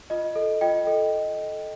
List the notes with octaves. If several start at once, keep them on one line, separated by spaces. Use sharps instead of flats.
F4 D#5
A4
F4 D#5 G5
A4